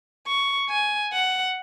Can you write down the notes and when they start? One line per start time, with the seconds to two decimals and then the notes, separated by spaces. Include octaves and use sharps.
0.27 C#6
0.70 G#5
1.13 F#5